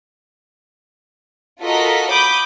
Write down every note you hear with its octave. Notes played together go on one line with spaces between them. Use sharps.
F4 F#4 A4 A#4 D#5 B6
B5 D6 D#6 G6